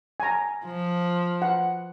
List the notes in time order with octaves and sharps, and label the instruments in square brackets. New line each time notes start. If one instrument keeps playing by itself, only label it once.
[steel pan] G#5 A#5
[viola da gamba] F3
[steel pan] F#5